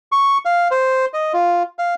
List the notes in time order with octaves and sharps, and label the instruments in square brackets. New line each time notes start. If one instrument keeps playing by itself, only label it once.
[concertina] C#6
F5
C5
D#5
F4
F5